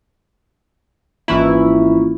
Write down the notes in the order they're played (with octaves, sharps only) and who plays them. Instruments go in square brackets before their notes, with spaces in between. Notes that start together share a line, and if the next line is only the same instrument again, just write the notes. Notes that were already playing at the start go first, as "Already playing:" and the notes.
[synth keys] G#1 E3 E4 [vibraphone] A#3 C#4 F4